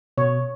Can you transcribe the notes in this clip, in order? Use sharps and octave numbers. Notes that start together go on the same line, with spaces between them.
B2 C#5